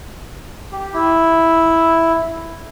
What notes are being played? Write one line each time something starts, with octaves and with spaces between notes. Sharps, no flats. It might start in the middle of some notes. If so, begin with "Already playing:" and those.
G4
E4